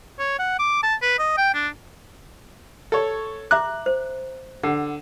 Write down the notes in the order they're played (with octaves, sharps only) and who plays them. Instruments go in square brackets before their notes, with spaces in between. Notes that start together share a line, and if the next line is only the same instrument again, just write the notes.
[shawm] C#5
F#5
D6
A5
B4
D#5
G5
D4
[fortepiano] A4 C#5
[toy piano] E5 A#5 D6 [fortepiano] F#6
[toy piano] C5
[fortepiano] D3 [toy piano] F#5